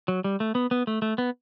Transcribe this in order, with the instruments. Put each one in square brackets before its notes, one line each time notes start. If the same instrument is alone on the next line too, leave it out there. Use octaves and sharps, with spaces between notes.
[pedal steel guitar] F#3
G3
A3
B3
B3
A3
A3
B3